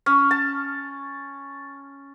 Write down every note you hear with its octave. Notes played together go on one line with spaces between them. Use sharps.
C#4
A5